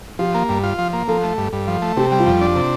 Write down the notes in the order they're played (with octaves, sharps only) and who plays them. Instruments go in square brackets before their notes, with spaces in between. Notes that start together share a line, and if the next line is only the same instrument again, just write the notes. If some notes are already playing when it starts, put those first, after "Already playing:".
[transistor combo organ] F3 [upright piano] G4
[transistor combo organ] A#3
G2
F4
F3
A#3
[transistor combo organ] F3 [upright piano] A4
[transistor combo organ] A3
G2
G2
F3
A3
[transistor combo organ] C3 [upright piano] G4
[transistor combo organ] G3
[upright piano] F4
[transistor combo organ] F2
D4
C3